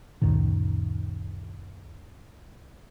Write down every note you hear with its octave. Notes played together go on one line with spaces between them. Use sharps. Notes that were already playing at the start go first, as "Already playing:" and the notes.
C#2 F#2 A#2 D#3